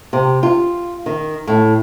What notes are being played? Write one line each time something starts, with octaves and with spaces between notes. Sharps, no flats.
C3
F4
D#3
A2